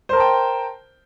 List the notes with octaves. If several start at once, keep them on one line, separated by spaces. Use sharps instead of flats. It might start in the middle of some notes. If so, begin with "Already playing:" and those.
A#4 C5 G5 A5